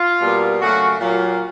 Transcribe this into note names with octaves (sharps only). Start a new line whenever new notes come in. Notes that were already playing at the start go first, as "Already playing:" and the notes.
Already playing: F4
B2 G3 A#3
C#3 F#3 A3 F#4
A#2 F#3 A#3